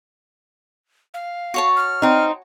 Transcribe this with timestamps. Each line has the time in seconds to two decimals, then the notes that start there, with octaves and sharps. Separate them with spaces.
1.14 F5
1.54 F#4 C#5 A5
1.76 F6
2.02 C4 D#4